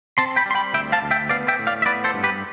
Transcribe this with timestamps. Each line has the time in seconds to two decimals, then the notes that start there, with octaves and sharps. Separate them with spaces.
0.18 C4 A5 C6
0.36 G5 B5
0.46 G3 C6
0.55 G5 B5
0.74 D2 E5 G5
0.92 F5 A5
1.02 D2
1.11 E5 G5
1.29 B3 D5 F5
1.48 E5 G5
1.59 A2
1.67 D5 F5
1.82 E5
1.86 B3 B4 D5
2.04 A4 C5
2.14 G2
2.24 G4 B4